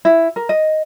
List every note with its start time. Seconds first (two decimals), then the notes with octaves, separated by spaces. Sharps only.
0.05 E4
0.36 A#4
0.49 D#5